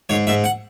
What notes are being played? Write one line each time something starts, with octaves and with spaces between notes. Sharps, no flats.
G#2 C#5
G#2 E5
F#5